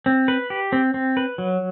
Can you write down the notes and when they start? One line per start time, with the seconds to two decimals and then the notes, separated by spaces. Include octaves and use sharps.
0.06 C4
0.28 B4
0.50 G4
0.72 C4
0.94 C4
1.17 B4
1.38 F#3